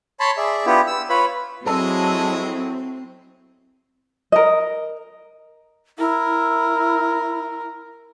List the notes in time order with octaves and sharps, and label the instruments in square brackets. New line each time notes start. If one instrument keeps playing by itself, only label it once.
[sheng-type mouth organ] C#5 A5 B5 C6
G#4 D5 E5
B3 D4 E4 F4 G4
E6
F4 B4 C#5 B5
[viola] F#3 E4 [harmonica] G#3 D#5 [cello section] C4 [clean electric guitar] A4
[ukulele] A#4 D#5
[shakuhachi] E4 [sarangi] A#4